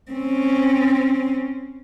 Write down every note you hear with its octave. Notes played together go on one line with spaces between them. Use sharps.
C4 C#4